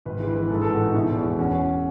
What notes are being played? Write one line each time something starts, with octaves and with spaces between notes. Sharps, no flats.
G#1 B4
E3
B4
E3
G#2 A4
A1 A4
F#4
B3 D#4
B2 E4
E2
E1
C#4 F#4